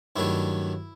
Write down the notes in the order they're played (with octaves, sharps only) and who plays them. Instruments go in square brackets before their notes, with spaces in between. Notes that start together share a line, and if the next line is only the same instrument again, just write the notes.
[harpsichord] G2 D#3 F#3 A3 E4